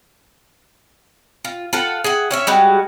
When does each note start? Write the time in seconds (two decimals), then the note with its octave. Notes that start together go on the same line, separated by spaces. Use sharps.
1.45 F4
1.73 F4 A4 F#5
2.04 G#4 E5 F#5
2.31 C#4 C#5 E5
2.47 G3 G#3 F#4